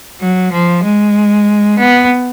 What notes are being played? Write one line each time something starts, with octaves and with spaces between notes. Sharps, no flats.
F#3
F3
G#3
B3